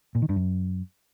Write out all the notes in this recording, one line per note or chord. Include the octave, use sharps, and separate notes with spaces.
A#2
D#3
G2
F#2